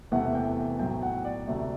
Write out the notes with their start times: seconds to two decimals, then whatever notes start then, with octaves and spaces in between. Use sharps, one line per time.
0.12 E1 E2 C3 E3 A3 F#5
0.35 G5
0.79 B1 A2 F#3 G5
1.02 F#5
1.25 D5
1.48 D2 C3 F#3 A3